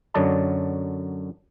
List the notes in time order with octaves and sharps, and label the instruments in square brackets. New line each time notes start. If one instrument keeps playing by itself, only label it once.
[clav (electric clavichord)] F#2 D3 F#3 D5 D#5 A5